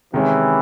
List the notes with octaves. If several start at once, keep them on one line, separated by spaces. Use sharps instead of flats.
C3 D#3 E3 G#3 C#4